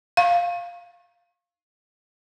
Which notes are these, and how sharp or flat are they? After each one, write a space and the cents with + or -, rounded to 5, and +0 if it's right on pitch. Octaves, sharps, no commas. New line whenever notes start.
F5 +0 C#6 -35